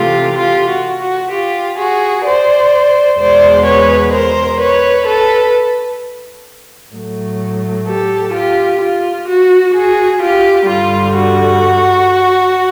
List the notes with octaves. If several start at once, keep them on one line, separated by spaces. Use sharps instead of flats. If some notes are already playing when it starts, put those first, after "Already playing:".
Already playing: C3 E3 A3 F4 G4
F4 G4
F#4
F#4
F4 G4
F#4 G#4
C5 D5
E2 B2 G#3 C5 D5
B4 C#5
A#4 C5
B4 C#5
A4 B4
A2 F#3 A3
G4 A4
F4 G4
F4
F#4
F#4 G#4
F4 G4
G2 D3 G3 F4
F#4